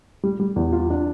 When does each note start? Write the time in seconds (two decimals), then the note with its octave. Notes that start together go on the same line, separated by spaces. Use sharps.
0.23 G3
0.40 G3
0.56 E2
0.73 F4
0.90 D4